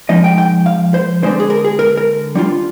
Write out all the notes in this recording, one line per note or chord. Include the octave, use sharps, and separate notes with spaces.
F3 G#3 D#4 D#5
G5
G5
F5
C5
D3 G#3 D4 C5
G#4
A#4
G#4
A#4
A#4
G3 D4 F4